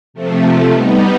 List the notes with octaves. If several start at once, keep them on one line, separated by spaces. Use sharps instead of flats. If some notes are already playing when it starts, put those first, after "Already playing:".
C3 F3 A3
G3 B3 D#4